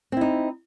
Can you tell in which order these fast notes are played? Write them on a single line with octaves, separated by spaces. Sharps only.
C4 E4 D#4